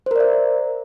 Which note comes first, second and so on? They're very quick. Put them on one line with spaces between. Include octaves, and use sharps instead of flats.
C5 A#4 D5 E5